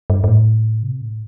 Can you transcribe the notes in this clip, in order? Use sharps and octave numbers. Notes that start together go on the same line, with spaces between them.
G2
G2
A2
C3
A2